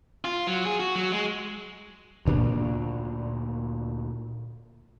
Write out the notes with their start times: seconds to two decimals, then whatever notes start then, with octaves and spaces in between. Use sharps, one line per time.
0.25 F4
0.47 F#3
0.65 G#4
0.80 F#4
0.96 F#3
1.12 G#3
2.25 D2 A#2 D4